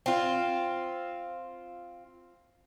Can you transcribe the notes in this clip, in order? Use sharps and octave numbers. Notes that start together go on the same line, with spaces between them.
C4 F4